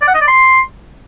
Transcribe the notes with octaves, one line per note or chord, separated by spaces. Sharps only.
D5
F#5
D#5
D5
C6